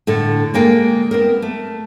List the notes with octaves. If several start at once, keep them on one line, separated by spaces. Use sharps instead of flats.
A2 D3 A4
G#3 A#3 G5
B3 C4 A#4
A3